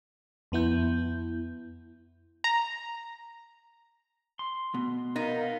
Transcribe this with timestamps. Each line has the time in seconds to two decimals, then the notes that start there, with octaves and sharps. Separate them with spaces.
0.52 F2 B3 E4 G6
2.44 A#5
4.39 C6
4.74 B2
5.16 B3 D#4 A#4 F5